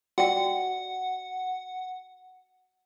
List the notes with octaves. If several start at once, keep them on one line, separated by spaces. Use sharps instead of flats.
F#4 D5 F#5 G5